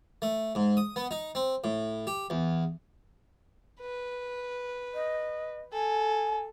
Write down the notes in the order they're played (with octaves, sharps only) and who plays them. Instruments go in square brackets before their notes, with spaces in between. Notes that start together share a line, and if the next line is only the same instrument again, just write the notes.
[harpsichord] A3
G#2
D#6
B3
D#4
C4
A2
G4
E2
[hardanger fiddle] B4
[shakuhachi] D#5
[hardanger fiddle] A4 [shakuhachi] G#5